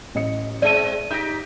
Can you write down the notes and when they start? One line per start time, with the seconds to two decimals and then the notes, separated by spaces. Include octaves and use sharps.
0.15 A1 D#5 C#7
0.62 G#3 C4 D5 E5 A5 D#7
1.11 D#4 G4 G6 A#6